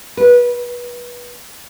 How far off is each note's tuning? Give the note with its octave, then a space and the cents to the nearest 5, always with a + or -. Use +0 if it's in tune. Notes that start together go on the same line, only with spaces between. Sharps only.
B4 -25